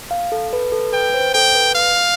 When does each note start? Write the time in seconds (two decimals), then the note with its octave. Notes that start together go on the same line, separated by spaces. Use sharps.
0.11 F5
0.32 A4
0.53 B4
0.72 A4
0.93 B4 G5
1.14 C5
1.34 A4 G5
1.55 B4
1.75 F5